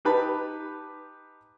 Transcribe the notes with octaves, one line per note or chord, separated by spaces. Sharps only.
D#4 G4 B4 A5 B5